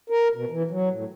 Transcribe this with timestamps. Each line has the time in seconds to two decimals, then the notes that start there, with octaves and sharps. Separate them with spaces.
0.10 A#4
0.36 B2
0.50 E3
0.71 F#3
0.90 A2